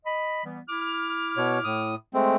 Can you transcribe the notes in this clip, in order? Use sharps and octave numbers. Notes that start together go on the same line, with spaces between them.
D#5 B5
E3 G3 B3
E4 D6 F6
B2 C#5
A2 D#6
G#3 A3 C4